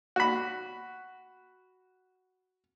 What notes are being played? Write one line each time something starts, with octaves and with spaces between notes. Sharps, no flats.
F#4 B5